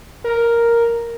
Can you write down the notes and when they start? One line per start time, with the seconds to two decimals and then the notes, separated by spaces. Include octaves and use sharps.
0.24 A#4